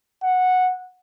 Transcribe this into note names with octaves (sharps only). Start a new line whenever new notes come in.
F#5